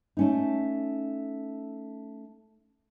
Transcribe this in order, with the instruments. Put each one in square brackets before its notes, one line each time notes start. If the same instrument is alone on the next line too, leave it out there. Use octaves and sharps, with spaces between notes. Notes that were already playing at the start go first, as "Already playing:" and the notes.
[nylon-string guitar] A3 C#4 D#4